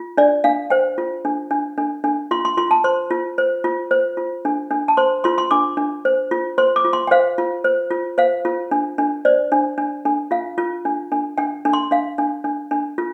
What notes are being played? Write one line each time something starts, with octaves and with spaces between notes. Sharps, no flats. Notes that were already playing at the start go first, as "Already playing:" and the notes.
Already playing: F4
D4 D5
D4 F5
C5 G5
F4
D4
D4
D4
D4
F4 C6
C6
F4 C6
A5
C5 C6
F4
C5
F4
C5
F4
D4
D4
A5
C5 C6
F4 C6
C6
D4 D6
D4
C5
F4
C5 C6
D6
F4
C6
G5
C5 F5
F4
C5
F4
C5 F5
F4
D4
D4
C5 D5
D4
D4
D4
F4 F5
F4
D4
D4
D4 G5
D4
C6
D4 F5
D4
D4
D4
F4